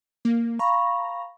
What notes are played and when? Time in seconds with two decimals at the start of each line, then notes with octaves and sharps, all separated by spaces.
0.25 A#3
0.59 F5 A#5 B5 C#6